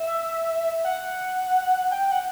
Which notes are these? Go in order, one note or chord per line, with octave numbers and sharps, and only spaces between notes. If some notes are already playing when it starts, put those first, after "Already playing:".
Already playing: E5
F#5
G5
F#5